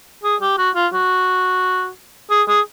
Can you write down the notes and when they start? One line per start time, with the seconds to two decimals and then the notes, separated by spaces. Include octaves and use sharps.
0.24 G#4
0.41 G4
0.58 F#4
0.75 F4
0.93 F#4
2.30 G#4
2.48 G#4